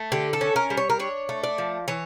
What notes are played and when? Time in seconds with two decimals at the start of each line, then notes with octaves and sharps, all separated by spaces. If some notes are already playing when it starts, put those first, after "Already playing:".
Already playing: A3
0.12 D3 G4
0.33 A4
0.41 C#4
0.56 A#4
0.70 G3
0.77 C#5
0.90 A#4
0.99 D4 C#5
1.29 A3
1.43 D5
1.58 F3
1.88 E3 C#5